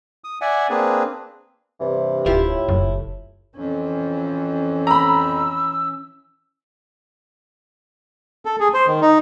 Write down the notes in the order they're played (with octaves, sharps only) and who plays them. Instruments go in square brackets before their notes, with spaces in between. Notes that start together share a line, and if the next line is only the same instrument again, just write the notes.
[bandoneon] D#6
D5 E5 F#5 G#5
A#3 C4 D4 G#4 B4
[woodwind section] G2 C3 E3
[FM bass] D1 [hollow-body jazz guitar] E4 F4 G4
[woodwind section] A2
[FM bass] F#1
[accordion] F2 [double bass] E3 C#4
[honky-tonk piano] A#5 B5 [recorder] E6
[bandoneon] A4
G#4
C5
D#3
D#4